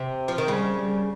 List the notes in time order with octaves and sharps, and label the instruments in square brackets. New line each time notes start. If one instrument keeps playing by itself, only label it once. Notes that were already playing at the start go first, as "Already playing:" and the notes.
Already playing: [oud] C3
F3
D#3
[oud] C#3 [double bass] G3
[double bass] G3